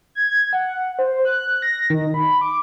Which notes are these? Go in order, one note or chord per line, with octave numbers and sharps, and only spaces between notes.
G#6
F#5
C5
F#6
A#6
D#3
B5
D6